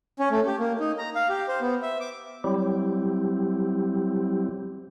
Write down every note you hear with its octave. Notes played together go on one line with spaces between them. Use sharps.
C#4
A3
G4
A#3
D#4
A#5
F5
G4
C5
B3
E5
D6
F#3 G3 C4 E4 G4